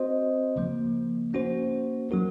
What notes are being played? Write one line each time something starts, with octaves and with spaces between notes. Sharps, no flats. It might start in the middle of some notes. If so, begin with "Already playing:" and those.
Already playing: C4 F#4 C5 D#5
C#3 F3 A#3
A#3 C#4 F#4 C5
F#3 C#4 F#4 A#4